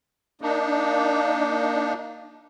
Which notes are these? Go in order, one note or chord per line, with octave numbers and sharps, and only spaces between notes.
A#3 D4 D#4